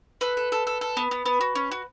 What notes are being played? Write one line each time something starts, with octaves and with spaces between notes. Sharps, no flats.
A4 B4
A4
A4
A4
A4
B3
B3
B3
F#4
C#4
F#4